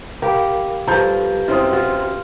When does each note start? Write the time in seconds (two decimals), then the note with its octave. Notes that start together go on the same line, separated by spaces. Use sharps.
0.22 G4 A#4 F5 B5
0.88 G2 F3 A4 A#5 B5 G6
1.48 F#2 C4 E4 F4 D#6
1.73 F4 F#4